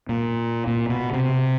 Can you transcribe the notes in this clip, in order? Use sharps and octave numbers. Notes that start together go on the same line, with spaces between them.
A#2
A#2
B2
C3